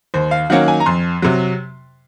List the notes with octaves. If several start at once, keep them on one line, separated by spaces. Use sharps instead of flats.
D#2 C5
F5
D#3 F#3 A#3 C#4 F#5
G#5
A#5
F2 C6
C3 F#3